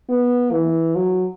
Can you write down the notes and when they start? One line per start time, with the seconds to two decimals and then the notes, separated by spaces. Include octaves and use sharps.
0.09 B3
0.52 E3
0.95 F#3